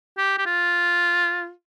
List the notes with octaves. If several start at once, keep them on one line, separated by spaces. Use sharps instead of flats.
G4
G4
F4